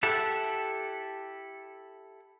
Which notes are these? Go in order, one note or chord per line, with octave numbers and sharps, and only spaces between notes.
E4 G4 A4 E5 F#5